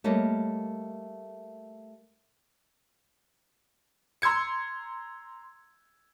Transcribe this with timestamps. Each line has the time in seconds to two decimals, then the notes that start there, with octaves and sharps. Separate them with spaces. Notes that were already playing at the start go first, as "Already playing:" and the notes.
0.04 G3 A3 A#3 C#5 D#5
4.22 A#5 C6 E6 G#6 C#7